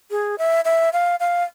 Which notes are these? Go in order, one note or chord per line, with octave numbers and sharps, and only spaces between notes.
G#4
E5
E5
F5
F5